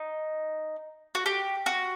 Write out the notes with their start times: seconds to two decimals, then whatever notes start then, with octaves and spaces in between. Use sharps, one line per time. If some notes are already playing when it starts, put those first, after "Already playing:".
Already playing: D#4
1.15 F#4
1.26 G4
1.66 F#4